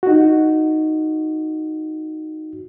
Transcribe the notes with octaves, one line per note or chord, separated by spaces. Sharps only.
D#4 F#4